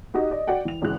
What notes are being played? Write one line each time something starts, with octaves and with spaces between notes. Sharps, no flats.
D#4 F#4 G4 D#5
D5 D#5
F#4 D5 F#5 G5
E3 F7
G#1 C#2 E3 F#6